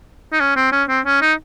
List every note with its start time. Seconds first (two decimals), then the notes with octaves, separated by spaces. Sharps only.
0.32 D#4
0.40 C#4
0.56 C4
0.72 C#4
0.89 C4
1.06 C#4
1.22 D#4